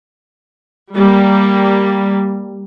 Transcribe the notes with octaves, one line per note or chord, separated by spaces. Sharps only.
G3 A#3